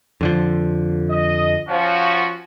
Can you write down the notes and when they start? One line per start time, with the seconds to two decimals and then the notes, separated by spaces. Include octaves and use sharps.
0.21 F2 D3 F3
1.10 D#5
1.68 F3 C#4 F#4